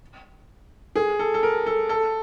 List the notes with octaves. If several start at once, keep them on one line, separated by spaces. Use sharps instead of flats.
G#4
A4
A4
A#4
A4
A4